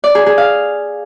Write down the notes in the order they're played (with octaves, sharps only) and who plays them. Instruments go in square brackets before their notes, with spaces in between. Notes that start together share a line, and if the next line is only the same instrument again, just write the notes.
[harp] D5
G#4
G#4
F5